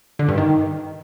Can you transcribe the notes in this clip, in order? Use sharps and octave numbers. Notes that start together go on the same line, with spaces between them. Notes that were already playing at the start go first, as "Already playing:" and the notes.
D3
G2
D#3